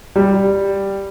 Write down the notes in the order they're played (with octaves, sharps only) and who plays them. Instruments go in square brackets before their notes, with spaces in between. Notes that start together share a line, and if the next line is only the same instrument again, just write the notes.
[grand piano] G3